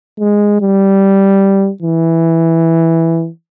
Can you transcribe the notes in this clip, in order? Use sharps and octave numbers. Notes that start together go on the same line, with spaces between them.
G#3
G3
E3